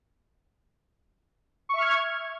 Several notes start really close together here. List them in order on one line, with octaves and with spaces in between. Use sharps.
C#6 E5 F6 G#6